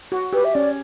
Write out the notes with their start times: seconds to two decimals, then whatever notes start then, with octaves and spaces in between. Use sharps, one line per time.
0.12 F#4
0.33 G4 B4
0.45 E5
0.54 C#4 D5